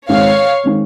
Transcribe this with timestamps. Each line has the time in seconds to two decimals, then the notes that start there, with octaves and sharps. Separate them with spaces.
0.08 G#2 D#3 G#3 C4 C#5 F5
0.64 D#3 G#3 C4